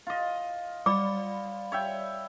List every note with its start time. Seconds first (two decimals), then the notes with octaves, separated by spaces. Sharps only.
0.07 F4 D#5
0.86 G3 D5 B5 D6
1.72 C#5 E5 G5